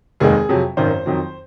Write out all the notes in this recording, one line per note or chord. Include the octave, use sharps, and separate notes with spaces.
F1 D#2 D#3 G#3 G#4
F2 C3 F#3
G#1 F#2 D#3 C5
F2 D#3 F#3